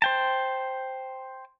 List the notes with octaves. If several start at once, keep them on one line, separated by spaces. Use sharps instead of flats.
C5 G5 A5